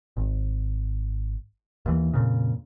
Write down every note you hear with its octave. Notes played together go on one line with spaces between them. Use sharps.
G#1
D#2 E3
F2 A#2 C#3